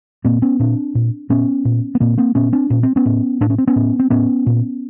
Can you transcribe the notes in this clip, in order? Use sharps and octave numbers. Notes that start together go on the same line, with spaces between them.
A#2 A#3 C4
B3 C#4
A#2 C4 D4
A#2
A#2 B3 C#4
A#2
B3
A#2 A#3 C4
A#3 C4
A#2 B3 C#4
C4 D4
A#2 C#4
C4
B3 C#4
A2
A2 D4
C#4
C4
B3 C#4
A2
C4
A2 B3 C#4
A#2